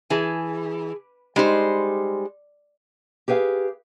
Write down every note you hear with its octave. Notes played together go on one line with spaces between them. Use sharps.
E3 G#4 A5
G3 G#3 D#4 C5
G4 G#4 B4 E5 F5